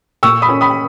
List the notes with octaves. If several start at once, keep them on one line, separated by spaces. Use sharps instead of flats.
A#2 C#6 E6
B5 D#6
C#4
B5 D#6